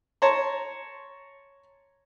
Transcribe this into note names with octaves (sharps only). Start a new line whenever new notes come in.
C#5 A5 A#5 C6